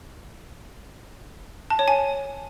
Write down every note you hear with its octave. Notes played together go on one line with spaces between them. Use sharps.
A5
C#5
G#5